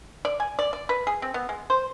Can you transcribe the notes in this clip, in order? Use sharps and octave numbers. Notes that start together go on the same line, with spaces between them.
D5
G#5
D5
D5
B4
G#4
C4
B3
G#3
C5